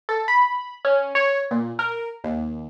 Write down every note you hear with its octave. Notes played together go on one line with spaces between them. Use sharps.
A4
B5
C#4
C#5
A#2
A#4
D#2